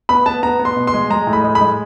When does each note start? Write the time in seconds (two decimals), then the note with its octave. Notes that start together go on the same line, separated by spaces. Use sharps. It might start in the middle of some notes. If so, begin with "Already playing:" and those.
0.09 B3 B5
0.26 B3 A5
0.43 B3 A#5
0.59 B3
0.65 C6
0.77 B2
0.87 C6
0.94 G#3
1.10 G#3 A#5
1.27 A2
1.33 B5
1.44 G#3
1.55 B5
1.61 G#3